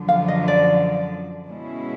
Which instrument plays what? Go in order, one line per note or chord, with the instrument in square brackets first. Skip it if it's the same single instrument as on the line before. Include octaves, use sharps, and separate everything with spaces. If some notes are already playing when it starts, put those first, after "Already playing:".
Already playing: [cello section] F#2 D3 F3
[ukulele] F5
D#5
D5
[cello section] B2 G#3 C#4 E4